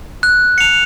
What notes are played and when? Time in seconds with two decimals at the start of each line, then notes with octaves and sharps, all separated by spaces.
0.23 F#6
0.58 C#7 F7